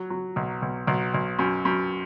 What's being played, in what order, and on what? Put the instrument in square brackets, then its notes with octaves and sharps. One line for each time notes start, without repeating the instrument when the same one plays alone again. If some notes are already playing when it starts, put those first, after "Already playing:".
Already playing: [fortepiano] F#3
F#3
B1
B1
B1
B1
F#2
F#2